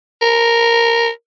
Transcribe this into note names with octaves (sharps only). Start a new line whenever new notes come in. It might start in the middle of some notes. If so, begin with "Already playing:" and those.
A#4